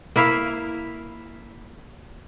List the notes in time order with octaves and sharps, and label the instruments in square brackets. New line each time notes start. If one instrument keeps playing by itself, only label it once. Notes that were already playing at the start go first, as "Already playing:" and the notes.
[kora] A#3 E4 E5 F5